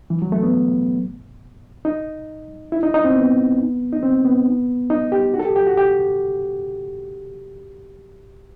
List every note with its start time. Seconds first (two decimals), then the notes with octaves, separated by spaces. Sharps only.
0.10 E3
0.22 F#3
0.32 A3
0.43 B3
1.85 D#4
2.72 E4
2.83 D#4
2.94 D#4
3.05 C4
3.16 B3
3.93 D#4
4.03 C4
4.25 B3
4.90 D#4
5.12 G4
5.34 F#4
5.39 A4
5.45 G4
5.56 G4
5.67 F#4
5.77 G4